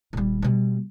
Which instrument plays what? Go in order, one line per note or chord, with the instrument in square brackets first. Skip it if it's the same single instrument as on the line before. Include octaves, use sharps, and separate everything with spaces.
[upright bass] D#1 G3
B2 G3